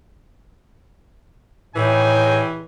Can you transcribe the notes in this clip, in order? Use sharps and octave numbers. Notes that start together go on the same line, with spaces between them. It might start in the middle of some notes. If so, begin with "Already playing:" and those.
A2 E3 D#4 G5 G#5